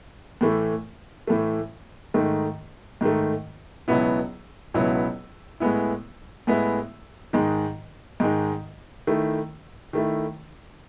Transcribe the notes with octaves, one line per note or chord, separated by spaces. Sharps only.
A2 E3 A3
A2 E3 A3
G#2 D#3 A3
G#2 D#3 A3
C#2 B2 F#3 B3 E4
C#2 B2 F#3 B3 E4
A2 G#3 B3 E4
A2 G#3 B3 E4
G#2 D#3 G#3 D#4
G#2 D#3 G#3 D#4
D#3 A3 E4
D#3 A3 E4